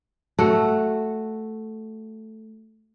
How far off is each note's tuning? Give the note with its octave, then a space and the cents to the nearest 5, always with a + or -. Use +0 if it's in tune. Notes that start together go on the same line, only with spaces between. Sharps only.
A3 +0 F#4 +0